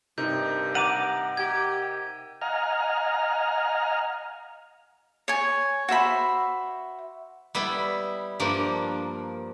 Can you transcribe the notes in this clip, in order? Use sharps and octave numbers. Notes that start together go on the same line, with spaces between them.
G2 C3 D#4 A#4 G6
F#5 A#5 D6 D#7
G4 G#6
D#5 F5 F#5 G#5 A#5 F6
C#5 G#5
F#4 C5 E5 B5
G3 B3 E4
G2 F3 A#3 D4